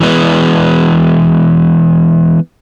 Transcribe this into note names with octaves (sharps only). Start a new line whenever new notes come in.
E3 G#3 B3